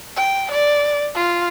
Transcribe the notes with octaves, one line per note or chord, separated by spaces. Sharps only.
G5
D5
F4